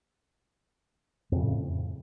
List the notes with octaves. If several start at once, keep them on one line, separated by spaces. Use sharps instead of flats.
F2 A2 C#3